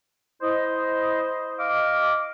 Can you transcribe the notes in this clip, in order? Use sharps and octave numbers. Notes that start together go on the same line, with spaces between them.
E4 C5 D#5
D#5 F5 D6